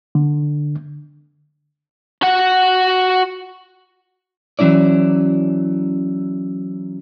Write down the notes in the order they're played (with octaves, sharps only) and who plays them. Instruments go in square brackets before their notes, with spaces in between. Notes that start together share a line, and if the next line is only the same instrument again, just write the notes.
[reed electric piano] D3
[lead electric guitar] F#4 F#5
[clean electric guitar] E3 F#3 C#4 E4 D5